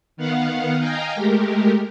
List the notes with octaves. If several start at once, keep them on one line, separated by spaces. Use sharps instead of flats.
D#3 B3 F5 F#5
D#5 F5 G5 G#5 A#5
G#3 A3 G4 A#4